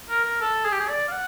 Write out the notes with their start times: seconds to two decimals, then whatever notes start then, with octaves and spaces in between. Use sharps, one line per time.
0.10 A#4
0.25 A#4
0.41 A4
0.65 G#4
0.72 G4
0.80 G#4
0.89 D5
1.09 F5
1.12 F#5